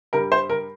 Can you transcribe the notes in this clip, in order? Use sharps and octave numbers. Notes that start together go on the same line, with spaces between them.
G2 G3 A#4
C5
A#4